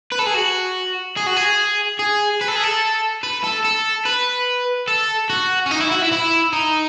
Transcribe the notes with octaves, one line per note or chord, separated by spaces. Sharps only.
B4
A4
G#4
F#4
G#4
F#4
G#4
G#4
B4
A4
G#4
A4
B4
A4
A4
B4
A4
F#4
C#4
D#4
E4
F#4
E4
E4
D#4